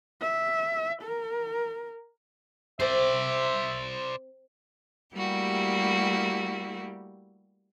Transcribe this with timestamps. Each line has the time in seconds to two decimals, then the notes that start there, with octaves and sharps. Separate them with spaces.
0.22 E5
1.02 A#4
2.80 C4 C5 D5 E5
5.15 G3 A3 A#3 E4 F#4 G4